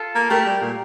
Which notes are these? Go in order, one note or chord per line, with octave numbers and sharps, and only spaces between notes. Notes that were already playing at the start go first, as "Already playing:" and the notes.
Already playing: F4 A4
A#3
A3 G4 A#4
G3
A#2